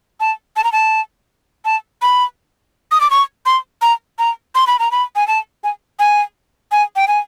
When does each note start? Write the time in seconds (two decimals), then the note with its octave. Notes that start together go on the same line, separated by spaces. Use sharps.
0.20 A5
0.56 A5
0.64 A#5
0.72 A5
1.65 A5
2.02 B5
2.91 D#6
3.01 D6
3.11 C#6
3.46 C6
3.82 A#5
4.19 A#5
4.55 C6
4.67 B5
4.79 A#5
4.91 B5
5.16 G#5
5.28 A5
5.64 G#5
5.99 G#5
6.72 G#5
6.96 G5
7.08 G#5